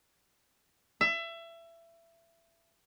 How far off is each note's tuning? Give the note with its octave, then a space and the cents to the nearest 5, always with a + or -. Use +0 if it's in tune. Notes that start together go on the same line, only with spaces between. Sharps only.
E5 +25